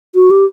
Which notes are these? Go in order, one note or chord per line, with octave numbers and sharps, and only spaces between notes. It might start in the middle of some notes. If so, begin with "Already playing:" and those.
F#4
G4